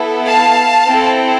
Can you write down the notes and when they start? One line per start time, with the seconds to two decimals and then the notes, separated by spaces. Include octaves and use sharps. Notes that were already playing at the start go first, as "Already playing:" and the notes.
Already playing: B3 E4 A4
0.27 F5 A5
0.87 C4 E4 A4